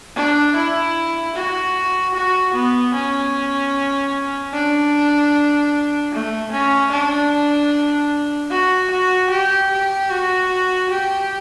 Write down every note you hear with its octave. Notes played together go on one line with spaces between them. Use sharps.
D4
E4
F#4
F#4
B3
C#4
D4
A3
C#4
D4
F#4
F#4
G4
G4
F#4
G4